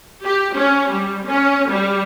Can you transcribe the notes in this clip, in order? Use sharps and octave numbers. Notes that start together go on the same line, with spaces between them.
G4
C#4
G3
C#4
G3